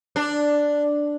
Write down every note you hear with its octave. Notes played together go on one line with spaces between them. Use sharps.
D4